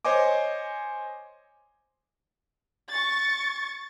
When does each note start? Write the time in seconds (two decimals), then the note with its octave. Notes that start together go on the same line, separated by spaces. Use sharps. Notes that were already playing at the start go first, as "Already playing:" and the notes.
0.05 C5 C#5 D#5 G#5 D6
2.89 C#6 A6